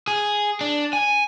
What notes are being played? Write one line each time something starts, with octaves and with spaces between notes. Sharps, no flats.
G#4
D4
G#5